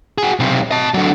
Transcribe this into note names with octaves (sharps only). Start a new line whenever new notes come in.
F#4 G#4
B1 C3
D#5 A5
D3 F#3